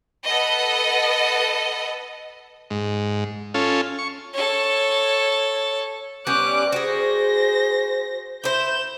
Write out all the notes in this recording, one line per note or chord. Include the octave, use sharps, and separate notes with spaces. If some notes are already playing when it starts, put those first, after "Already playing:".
A4 B4 D#5 F#5
G#2
C#4 F4 A4
C#6
A4 C#5
G3 B3 C#4 D6 F#6
F#4 G#4 C5 A#6
E4 C5 G6 E7